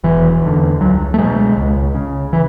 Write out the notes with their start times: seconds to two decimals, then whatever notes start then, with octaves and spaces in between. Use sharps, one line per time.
0.04 E1 E3
0.41 E2 D3
0.80 C#2 F#3
1.14 A3
1.18 B2 G#3
1.57 C#2
1.95 C#3
2.33 E3